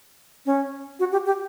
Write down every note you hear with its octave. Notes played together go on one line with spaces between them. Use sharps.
C#4
F#4
G4
G4